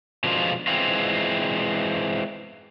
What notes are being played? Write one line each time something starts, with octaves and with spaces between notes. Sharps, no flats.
B2 D3 F3 G#3 D4 F4
E3 G#3 C4 F4